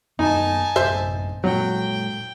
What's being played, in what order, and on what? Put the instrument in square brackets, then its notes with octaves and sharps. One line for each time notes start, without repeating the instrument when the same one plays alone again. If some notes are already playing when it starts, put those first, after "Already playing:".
[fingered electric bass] F#2 B3 [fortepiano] D#4 [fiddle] G#5 A5
[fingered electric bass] A1 F#2 [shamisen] C5 E5
[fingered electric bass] A#2 G#3 [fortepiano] F#3 [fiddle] G5